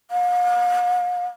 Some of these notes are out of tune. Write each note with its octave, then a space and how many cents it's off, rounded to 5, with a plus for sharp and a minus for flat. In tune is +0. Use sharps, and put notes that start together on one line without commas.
F5 +45